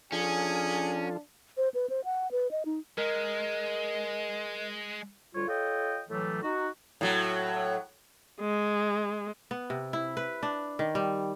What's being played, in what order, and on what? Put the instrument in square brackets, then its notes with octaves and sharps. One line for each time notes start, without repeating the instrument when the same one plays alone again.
[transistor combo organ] F3 F4 A4 [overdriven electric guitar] C#4 [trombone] D4 [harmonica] G#4
[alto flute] C5
B4
C5
F#5
B4
D#5
D#4
[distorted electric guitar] G#3 [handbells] A#4 [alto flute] D#5
[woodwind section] D2 G3 F4 C#5
F4 A4 C#5 D#5 G5
A2 E3 F#3 G3 A3
D#4 F#4
[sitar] A2 F#3
[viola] G#3
[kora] B3
C3
E4
B4
D4
D#3
G3